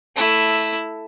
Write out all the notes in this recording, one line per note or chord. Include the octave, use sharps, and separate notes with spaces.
A3 E4